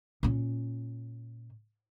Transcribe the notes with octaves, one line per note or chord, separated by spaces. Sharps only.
A#2 C#4